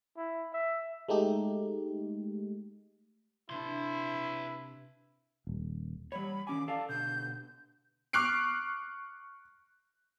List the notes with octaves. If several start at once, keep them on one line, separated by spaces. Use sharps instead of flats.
E4
E5
G#3 A3 D#4 G4
C3 C4 D4 E4 B4 C6
D#1
G3 C#5 B5
D#3 C#4 G#5 D6
A4 D5 F5 A5
B2 D3 G6
C#6 D6 F6 F#6 C7 D7